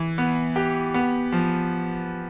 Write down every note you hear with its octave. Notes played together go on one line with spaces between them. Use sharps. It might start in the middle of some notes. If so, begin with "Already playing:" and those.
Already playing: E3
B3
G4
B3
F3